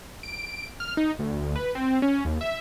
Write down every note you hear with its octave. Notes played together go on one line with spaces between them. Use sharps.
D7
F6
D#4
D2
B4
C4
C#4
D#2
E5